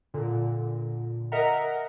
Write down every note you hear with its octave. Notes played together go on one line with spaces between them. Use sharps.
A#2 D3
A#4 D#5 E5 F#5 A#5